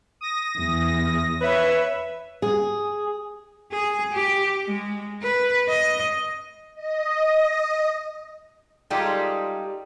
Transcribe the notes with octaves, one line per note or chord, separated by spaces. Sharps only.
D#6 A#6
E2
B4 C#5 E5
G#4
G#4
G4
G#3
B4
D#5
D#5
G3 G#3 D#4 F4 G4 A4